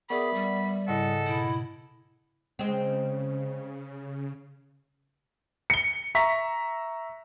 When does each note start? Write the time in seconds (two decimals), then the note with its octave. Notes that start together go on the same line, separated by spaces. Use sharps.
0.10 B3 G#4 A#4 D5 E5 B5
0.34 G3
0.88 G#2 C#3 E4 G#4 A4 D#5 F#5
1.27 B2 E4
2.59 C#3 G#3 C4
5.70 C#7 G7
6.15 E5 A#5 C#6 B6